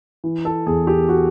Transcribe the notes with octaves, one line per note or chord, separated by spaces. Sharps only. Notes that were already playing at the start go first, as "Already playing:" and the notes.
E3
A4
E2 G#4
G4
F#4